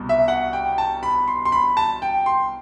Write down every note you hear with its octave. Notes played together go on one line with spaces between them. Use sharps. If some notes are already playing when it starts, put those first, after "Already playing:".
Already playing: C2 B2
E5
F#5
G5
A5
B5
C6
C6
B5
A5
G5
C6